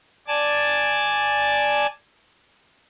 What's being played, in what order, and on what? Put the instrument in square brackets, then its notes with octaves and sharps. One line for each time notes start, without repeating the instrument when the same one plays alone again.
[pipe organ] D5 G#5 A5